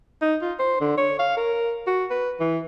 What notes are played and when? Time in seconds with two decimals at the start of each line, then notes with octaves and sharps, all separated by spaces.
0.22 D#4
0.42 F4
0.59 C5
0.81 D3
0.98 C#5
1.19 F5
1.37 A#4
1.87 F#4
2.11 B4
2.40 E3